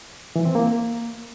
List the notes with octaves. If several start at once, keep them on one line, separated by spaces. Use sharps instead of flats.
E3
C4
A#3